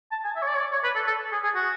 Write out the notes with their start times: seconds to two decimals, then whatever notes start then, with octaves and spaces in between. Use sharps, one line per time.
0.12 A5
0.24 G#5
0.36 E5
0.42 C#5
0.47 D5
0.56 C#5
0.60 D5
0.72 C#5
0.84 B4
0.95 A4
1.07 A4
1.32 G#4
1.44 G#4
1.55 F#4